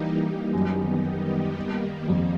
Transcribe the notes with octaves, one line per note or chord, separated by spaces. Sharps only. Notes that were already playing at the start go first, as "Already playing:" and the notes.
Already playing: E3 G3 A#3 D#4 G4
F#2 D#3 G3 B3 D#4 G4
D#3 G3 A#3
F2